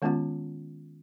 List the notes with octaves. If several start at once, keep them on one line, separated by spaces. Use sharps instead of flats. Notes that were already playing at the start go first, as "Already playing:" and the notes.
D#3 G#3 B3 C#4 F4 F#5